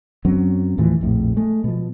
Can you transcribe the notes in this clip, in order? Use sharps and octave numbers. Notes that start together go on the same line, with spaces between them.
F#2 F#3 C4 C#4
D#2 A2 E3 F3
A#1 F2 A2
G#3 A3
B2 F3